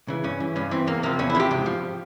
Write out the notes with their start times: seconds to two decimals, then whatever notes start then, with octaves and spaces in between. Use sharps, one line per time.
0.08 C#3 E3
0.24 G2 C#4
0.40 E3
0.56 G2 C#4
0.71 E3 C4
0.87 E2 A#3
1.03 C3 F3 A#3
1.19 E2 C#4
1.30 E4
1.35 C3 F3 G4
1.51 G#2 G4
1.66 F3